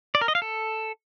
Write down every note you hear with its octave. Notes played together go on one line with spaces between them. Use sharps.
D5
A#4
D#5
F5
A4